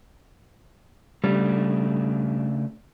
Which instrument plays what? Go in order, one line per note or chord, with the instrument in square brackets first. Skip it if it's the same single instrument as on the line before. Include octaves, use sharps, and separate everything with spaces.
[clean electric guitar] C#3 A3 D4 [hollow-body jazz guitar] G3